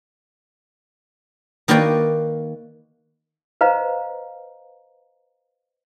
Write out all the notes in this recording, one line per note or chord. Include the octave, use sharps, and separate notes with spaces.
D#3 A#3 F#4 B4 D5 G5
B4 C5 D#5 F5 A#5